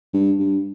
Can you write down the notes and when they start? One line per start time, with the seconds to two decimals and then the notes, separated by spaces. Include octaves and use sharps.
0.14 G2
0.39 G2